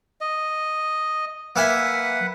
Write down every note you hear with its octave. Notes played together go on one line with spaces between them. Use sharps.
D#5
A#3 B4 E5 F#5 G#5